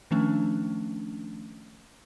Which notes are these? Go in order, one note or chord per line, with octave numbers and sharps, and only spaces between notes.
D#3 F3 A3 C#4 D4